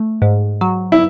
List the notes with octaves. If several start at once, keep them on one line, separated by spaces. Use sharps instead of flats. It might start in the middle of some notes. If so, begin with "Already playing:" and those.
Already playing: A3
G#2
F#3
E4